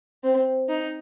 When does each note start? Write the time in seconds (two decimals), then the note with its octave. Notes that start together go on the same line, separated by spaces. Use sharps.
0.24 C4
0.69 D#4